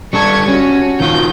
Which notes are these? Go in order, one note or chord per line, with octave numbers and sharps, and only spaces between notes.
G3 D4 A4 C#6 G#6
C#4 F#4
D#3 F4 F#4 G6